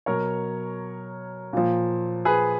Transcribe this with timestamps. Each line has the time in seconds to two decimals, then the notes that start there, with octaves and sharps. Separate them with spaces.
0.06 B2 F#3 A#4 C#5
1.53 A#2 F3
2.25 G#4 B4